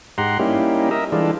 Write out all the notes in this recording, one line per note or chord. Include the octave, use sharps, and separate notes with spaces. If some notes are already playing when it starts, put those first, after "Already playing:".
G#2 G4 F#5 A#5 C6
G3 A#3 C#4 D#4 E4 G4
A#4 D#5 E5
E3 G3 G#3 D4 F4 A4